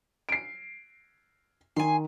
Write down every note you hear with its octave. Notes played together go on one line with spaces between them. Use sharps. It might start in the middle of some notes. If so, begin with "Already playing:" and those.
C7 D7
D#3 G#5 C6